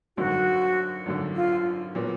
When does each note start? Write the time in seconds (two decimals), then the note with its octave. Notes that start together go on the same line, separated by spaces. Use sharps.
0.17 G#1 F#2 D3 F#4
1.06 G#1 F#2 D3
1.36 F4
1.95 A#2 F#3 B3